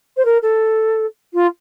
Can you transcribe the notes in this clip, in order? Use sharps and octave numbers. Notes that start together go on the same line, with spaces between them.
C5
A#4
A4
F4